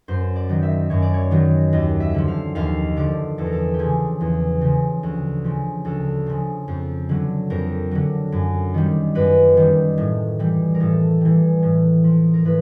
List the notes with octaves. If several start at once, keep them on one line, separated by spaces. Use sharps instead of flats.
F#2 C5
D5
D#3 F#3
E5
F#2 C#5
D5
C#5
D#3 F#3
D#2 D#5
E5
D3 F3
F5
D#2 F5
D3 F3 D5
E2 A4
A#4
A4
G4
C#3 F3 G#4
E2
C#3 F3
D2
C#3 F3
D2 A4
C#3 F3
F2
D3 F#3
F2 A#4
D3 F#3
F#2
D#3 G3
F#2 B4
D#3 G3
A2
E3 G3
A#4
A2 A4
E3 G3
A2
F3
A#4
A2 B4